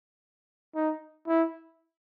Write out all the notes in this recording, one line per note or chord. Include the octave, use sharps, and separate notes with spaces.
D#4
E4